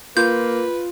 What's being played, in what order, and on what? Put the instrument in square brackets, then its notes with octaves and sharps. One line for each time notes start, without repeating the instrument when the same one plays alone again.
[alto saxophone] A#3 [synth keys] F4 [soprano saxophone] B4 [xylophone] G6